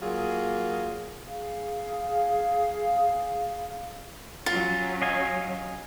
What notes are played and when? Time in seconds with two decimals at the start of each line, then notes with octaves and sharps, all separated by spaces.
0.02 F#3 A#3 F4 G#4
1.27 G#4 F5
4.46 F#3 C#4 F4
5.02 D#5 F5 G#5